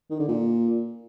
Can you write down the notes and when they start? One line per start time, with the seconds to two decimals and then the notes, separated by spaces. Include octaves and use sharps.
0.10 D#3
0.19 D3
0.28 A#2